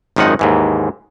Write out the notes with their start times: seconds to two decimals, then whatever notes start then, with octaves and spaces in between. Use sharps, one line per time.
0.16 G#1 F#2 D#3 F3 D#4 F#5
0.39 D#2 G#2 E3